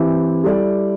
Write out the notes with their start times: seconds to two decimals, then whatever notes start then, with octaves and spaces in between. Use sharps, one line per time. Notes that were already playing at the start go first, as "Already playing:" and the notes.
Already playing: E3 C4 E4 G4 E5
0.44 G3 E4 A4 D5